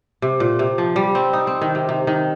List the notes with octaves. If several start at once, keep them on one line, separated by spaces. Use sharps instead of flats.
C3
A#2
C3
F3
G3
C4
D#4
C4
D#3
C3
C3
D#3